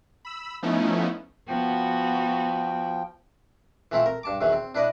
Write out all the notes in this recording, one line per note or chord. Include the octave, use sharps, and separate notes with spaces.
B5 E6
F3 A3 B3 C#4 D#4 E4
F3 B3 F#4 G5
E3 A3 C4 E4 F4
A#4
G2 A5 D6
E2 D#3 E3 F#3
C4
D4 E4 B4 D5 D#5